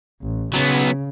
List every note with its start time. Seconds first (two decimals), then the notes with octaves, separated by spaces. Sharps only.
0.22 A1
0.54 C#3 F#3 B3